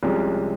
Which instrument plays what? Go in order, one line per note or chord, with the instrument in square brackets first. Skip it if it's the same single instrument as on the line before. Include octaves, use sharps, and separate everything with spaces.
[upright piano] C2 C3 F3 G#3 C#4